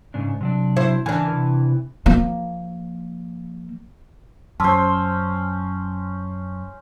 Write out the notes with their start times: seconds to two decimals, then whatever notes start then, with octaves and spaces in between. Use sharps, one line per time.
0.14 G#2 C#3 D4
0.41 C3 F#3 D4
0.76 E4 C5
1.06 C#3 E3 D4 A#4 G#5
1.32 C3
2.06 F3 A#3
4.60 F#2 C#4 C5 A5 C6 E6